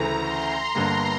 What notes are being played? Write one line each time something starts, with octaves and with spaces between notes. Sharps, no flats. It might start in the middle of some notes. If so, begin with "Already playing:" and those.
Already playing: D2 C#3 E3 A3 A#5
C6
G1 G2 D3 G3 A#3